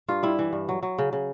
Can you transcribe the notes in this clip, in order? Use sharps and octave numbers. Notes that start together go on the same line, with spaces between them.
G2 F4
G3 E4
E3
G2
F#3
F#3
C#3
C#3